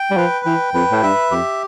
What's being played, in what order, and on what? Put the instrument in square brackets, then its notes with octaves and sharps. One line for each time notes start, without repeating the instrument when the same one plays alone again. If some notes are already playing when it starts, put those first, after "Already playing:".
Already playing: [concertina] G5
[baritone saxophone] G3
[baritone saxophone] F3 [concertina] B4
[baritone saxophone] E3 [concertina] G5
[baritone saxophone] F2 [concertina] B4
[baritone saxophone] A2
[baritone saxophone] G2 [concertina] E5
[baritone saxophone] F2 [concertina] G4